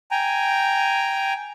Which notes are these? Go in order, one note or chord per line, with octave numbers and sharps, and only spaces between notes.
G5 G#5 A#5